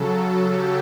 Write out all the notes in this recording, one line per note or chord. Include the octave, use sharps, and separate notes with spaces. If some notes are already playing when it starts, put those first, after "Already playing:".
Already playing: C#3 F#3 A4
G4